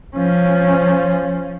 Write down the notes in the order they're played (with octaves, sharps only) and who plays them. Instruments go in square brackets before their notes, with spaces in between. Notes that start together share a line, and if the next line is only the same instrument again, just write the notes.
[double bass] F3 C#4